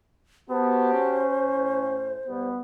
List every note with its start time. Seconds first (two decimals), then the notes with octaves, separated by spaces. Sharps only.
0.50 B3 F#4 G4 C5 A5
0.93 C#4
1.43 A2
2.27 B1 G3 B3